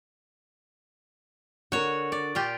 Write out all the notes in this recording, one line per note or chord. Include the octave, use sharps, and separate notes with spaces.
D3 F#4 A#4 C#5
D5
A#2 F4 G4